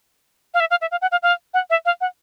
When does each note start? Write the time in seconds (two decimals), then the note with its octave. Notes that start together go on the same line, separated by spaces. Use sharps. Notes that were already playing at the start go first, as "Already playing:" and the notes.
0.54 F5
0.60 E5
0.71 F5
0.81 E5
0.91 F5
1.02 F#5
1.12 F5
1.23 F5
1.54 F#5
1.70 E5
1.85 F5
2.01 F#5